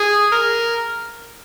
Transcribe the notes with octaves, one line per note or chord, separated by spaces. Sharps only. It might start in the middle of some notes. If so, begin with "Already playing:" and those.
Already playing: G#4
A#4